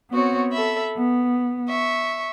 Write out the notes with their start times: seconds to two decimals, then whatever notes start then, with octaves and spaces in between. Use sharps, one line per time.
0.10 B3 C4 F#4 C#5
0.52 A4 E5 B5
0.96 B3
1.67 E5 C#6